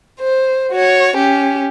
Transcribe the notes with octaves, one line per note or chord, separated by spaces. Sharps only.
C5
F#4 C#5
C#4 G4